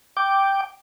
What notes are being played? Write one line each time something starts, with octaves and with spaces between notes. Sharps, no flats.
G5 D6